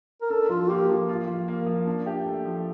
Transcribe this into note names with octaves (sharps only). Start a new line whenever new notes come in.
A#4
D4 A4
F3 F4
F4
A#3 G4
F3
F4
F3
A#3
F3
D4
G4
A3
F3